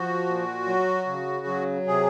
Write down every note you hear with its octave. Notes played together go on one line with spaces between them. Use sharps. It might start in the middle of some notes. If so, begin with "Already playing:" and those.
Already playing: F3 F#4
A#2
F#3
C#3
F#3
C3 G#4